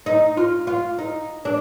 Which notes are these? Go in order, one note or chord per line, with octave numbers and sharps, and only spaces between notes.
D#4
F4
F4
D#4
D4